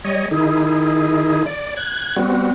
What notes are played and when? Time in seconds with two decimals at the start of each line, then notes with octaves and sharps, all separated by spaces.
0.04 G3 C#5 D#5
0.31 D#3 D#4 E4 G#4
1.46 D5
1.76 F#6 G#6
2.16 G3 B3 C4 F#4